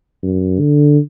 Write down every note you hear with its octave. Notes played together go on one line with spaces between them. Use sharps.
F#2
D3